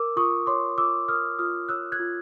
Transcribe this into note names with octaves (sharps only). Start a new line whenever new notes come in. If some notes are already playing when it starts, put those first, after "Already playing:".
Already playing: A#4 D6 E6
F4 C#6 D#6
C#5 C6 D6
F4 D6 E6
A#4 D#6 F6
F4 D#6 F6
C#5 E6 F#6
F#6 G#6
F4